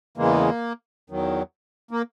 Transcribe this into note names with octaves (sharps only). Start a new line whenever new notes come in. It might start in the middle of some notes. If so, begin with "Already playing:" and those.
E2 C#3 E3 G#3 A#3
E2 D#3 F#3
A#3